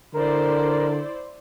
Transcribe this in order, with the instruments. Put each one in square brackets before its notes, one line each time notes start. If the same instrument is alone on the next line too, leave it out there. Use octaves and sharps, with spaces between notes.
[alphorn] D3 [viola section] E4 C5 D5 [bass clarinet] A#4